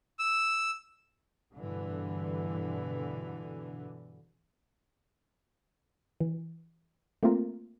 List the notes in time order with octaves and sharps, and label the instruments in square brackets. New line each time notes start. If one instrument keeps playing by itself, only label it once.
[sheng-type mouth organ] E6
[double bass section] G2 B2 D3 E3
[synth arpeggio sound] E3
A3 A#3 C4 F4 A#4